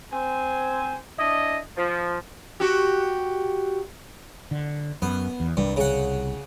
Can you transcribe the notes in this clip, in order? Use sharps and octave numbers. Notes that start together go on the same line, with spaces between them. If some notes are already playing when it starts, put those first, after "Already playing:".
C4 C5 G#5
D4 E4 D#5
F3
F#4 G4
D3
F#2 B3
E2
C2 G2
C#3 F#5